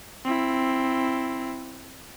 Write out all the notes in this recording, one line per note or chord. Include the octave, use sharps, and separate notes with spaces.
C4 E4